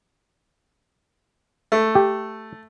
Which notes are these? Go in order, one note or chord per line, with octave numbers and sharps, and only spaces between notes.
A3
G4